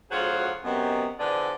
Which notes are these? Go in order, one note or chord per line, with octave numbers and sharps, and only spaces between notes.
D2 F#3 F4 G#4 C5 F#5
F#2 C3 D#3 B3
E2 D3 F3 B3 D5